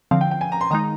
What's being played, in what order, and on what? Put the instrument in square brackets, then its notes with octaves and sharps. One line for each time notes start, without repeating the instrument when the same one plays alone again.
[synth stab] D3 F3 C4 [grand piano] F5
[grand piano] G5
G5
G#5
A#5
C6
[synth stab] D#3 G#3 D#4 [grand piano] A#5